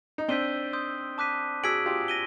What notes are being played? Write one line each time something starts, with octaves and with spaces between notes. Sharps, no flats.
D#4
C4 D4 E6 G6 B6 D#7 G7
C6 D#6 G6
A5 D6 F#6 B6 D#7
F#4 G#4 E6 G#6 B6 D7 F#7
F4 G4
A#6 D#7 G7